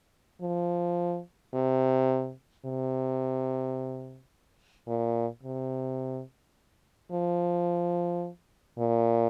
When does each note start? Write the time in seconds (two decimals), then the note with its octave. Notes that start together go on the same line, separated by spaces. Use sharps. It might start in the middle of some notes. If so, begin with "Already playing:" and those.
0.42 F3
1.54 C3
2.65 C3
4.88 A#2
5.43 C3
7.12 F3
8.79 A#2